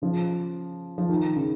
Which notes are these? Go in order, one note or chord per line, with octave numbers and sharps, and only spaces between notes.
C#3 F3
F3
D#3
C#3